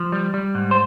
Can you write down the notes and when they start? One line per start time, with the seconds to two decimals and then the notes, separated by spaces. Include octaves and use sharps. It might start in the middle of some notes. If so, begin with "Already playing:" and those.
Already playing: F3
0.12 G3
0.34 G3
0.55 G#2
0.71 C5